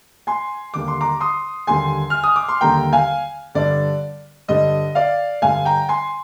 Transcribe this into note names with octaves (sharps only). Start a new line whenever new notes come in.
G#5 C6
D#2 D3 G3 A#3 D6
C6
A#5 D6
C6 D#6
D#2 D3 G3 A#3 G#5 C6
F6
D#6
D6
C6
D#2 D3 G3 A#3 G5 A#5
F5 G#5
G2 D3 G3 D5
G2 D3 G3 D#5
D5 F5
G2 D3 G3 F5 G#5
G5 A#5
G#5 C6